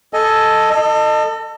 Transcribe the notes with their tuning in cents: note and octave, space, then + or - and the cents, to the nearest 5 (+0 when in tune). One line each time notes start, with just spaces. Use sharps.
A4 +0 D#5 +5 G#5 +15
A4 +25 D#5 -25